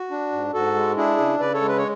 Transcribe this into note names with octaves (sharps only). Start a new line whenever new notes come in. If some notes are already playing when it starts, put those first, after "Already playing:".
Already playing: F#4
D4
G#2
G#2 F#4 A4
G#3
D4 E4 G#4
C#3
C#3 B4 D5
A4 C#5
G#3
B4
C#5